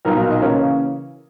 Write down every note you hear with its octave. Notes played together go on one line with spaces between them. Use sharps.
B1 A#2 F#3 B3 D#4 A#4
A#4
D#5
C#3 E3 A#3 C#4 A#4 C#5